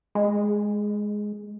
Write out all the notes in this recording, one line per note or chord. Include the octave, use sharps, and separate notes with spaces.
G#3